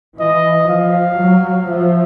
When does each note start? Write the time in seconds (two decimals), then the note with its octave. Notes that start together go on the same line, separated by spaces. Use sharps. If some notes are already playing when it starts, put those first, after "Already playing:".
0.19 E3 D#5
0.69 F3 F5
1.20 F#3
1.69 F3 E5